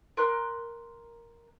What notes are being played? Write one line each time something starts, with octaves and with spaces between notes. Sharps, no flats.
A#4 C6 F#6